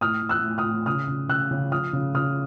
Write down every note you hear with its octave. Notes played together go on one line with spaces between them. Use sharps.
A2 D#6 F6
A2
E6 F#6
A2
D#6 F6
A2
C#3 D#6 F6
C#3
C#3 E6 F#6
C#3
F3 D#6 F6
C#3
C#3 D#6 F6